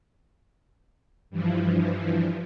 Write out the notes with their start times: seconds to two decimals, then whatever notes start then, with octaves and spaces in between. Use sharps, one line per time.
1.30 G2 E3 F3